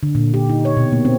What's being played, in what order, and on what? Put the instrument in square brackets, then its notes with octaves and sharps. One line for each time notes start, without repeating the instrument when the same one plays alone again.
[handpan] D3
A#2
G4
D#4
C#5
B2
A#3
C4